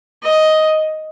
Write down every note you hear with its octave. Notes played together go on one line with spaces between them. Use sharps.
D#5